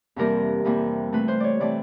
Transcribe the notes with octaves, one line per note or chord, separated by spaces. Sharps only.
F2 C3 E3 G3 A#3 A#4
F2 C3 E3 G3 A#3
C3 E3 A3 B4
C5
C#5 D5
C3 E3 A3 D5